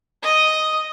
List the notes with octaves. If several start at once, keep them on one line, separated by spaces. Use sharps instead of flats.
D#5 D#6